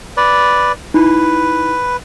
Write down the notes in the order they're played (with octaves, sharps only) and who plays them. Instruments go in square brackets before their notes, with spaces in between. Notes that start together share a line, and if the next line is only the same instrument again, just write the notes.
[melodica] B4 D5
[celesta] D#4 E4 [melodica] B4